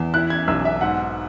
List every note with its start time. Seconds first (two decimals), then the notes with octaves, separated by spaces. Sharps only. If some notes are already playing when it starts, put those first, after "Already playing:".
Already playing: E2
0.14 E4 F#6
0.30 G#6
0.48 B1 E6
0.65 E5
0.81 G#2 F#5